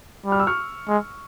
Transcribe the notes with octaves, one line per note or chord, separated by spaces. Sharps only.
G3
F6
E6
C#6 F6
G#3